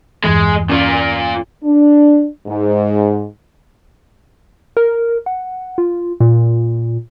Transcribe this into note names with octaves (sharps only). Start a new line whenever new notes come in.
E2 G2 E3 G#3
A#2 C#4 F4
D4
G#2
A#4
F#5
F4
A#2